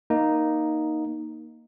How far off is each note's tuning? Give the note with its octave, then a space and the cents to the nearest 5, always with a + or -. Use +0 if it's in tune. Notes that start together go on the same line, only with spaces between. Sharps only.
A#3 +10 D#4 +0